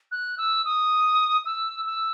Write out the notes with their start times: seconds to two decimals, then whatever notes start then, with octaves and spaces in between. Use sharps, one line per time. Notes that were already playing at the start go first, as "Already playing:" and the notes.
0.12 F#6
0.38 E6
0.65 D#6
1.46 E6
1.86 E6